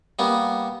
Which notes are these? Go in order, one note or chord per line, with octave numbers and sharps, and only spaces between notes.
G3 A#3 B3